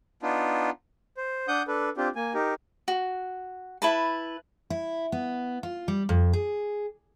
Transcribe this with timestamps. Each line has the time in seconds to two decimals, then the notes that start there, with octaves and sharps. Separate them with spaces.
0.23 B3 D4 D#4 F4
1.17 C5
1.48 D4 F#5 D#6 G6
1.67 D4 A4 B4
1.97 C4 D4 F4 G4
2.16 A#3 G#5
2.34 D#4 G4 A#4
2.88 F#4
3.82 E4 B4 A5
4.70 E4
5.12 B3
5.63 F4
5.88 G3
6.09 F2
6.33 G#4